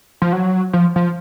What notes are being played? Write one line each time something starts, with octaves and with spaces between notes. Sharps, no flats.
F3
F#3
F3
F3